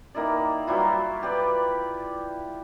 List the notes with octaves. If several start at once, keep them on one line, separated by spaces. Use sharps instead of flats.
D#3 A#3 E4 D5
F#3 G3 E4 F4
G4 B4 D5